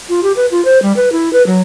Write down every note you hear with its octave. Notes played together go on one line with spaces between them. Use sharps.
F4
G4
B4
F4
C5
G3
B4
E4
B4
F#3